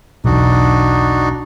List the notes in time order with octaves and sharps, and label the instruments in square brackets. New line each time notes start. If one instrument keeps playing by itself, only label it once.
[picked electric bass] E1 B1 [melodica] D4 D#4 F#4